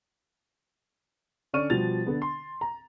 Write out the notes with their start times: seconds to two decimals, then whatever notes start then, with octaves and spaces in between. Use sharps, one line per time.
1.53 D3 C#4 D5 C#6 F6 D#7
1.70 B2 F3 G3 A6 F7
2.06 D3 B3
2.22 C6
2.61 A#5